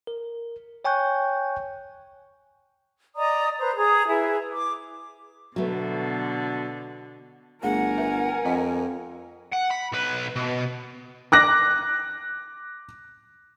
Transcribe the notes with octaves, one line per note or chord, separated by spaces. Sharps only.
A#4
C#5 G5 G#5 C#6 F#6 G6
D5 D#5 A#5 D#6
B4 C5 A#5
G#4 A#5 D#6
E4 G#4 B4 E5
D6
B2 D3 F#3 A3 B3
G1 A3 G#4 A#4 F#5 G#5
B4 E5
F2 C4 D#5
F#5
B5
B1 B4
B2
D6 F#6 A#6